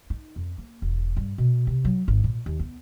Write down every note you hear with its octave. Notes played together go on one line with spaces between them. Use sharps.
D#4
F2
A#3
E1
G2
B2
C3
F#3
G#1
A#2
D#2
B3